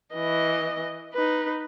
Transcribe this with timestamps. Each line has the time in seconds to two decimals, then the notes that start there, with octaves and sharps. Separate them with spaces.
0.14 E3 D#5
1.14 D#4 B4